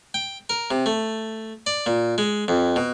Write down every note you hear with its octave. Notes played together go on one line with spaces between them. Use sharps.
G5
A#4
C3
A3
D5
A#2
G#3
F2
B2